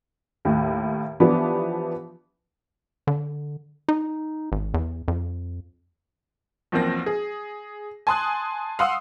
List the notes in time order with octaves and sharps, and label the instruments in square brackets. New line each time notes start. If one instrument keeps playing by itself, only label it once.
[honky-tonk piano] D#2 A2
E3 F3 B3 D4 G4
[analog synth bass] D3
D#4
G#1
E2
F2
[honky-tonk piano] B1 E2 F3 A#3 C4 A#6
G#4
G#5 A5 C6 D#6 F#6
F5 F#5 C6 D#6 E6